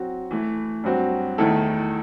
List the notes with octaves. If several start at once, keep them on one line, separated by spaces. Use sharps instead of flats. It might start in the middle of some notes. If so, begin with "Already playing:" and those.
Already playing: F#3 C4 F#4
E3 A3 E4
G2 F#3 C4 F#4
E2 D#3 A3 E4 A4